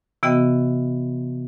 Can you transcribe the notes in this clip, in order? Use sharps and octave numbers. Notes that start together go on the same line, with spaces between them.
C3 E3 B3 F#4 D#5 G5